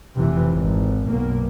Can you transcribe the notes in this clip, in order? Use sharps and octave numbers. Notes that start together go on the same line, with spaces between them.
F1 C3 E3
G#1
B1 F#2 B2 A#3